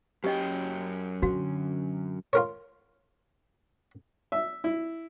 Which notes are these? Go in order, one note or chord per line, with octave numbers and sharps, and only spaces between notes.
F#2 C#4 G4 D#5 G5
D3 F#4
F4 A#4 C#5
E5
E4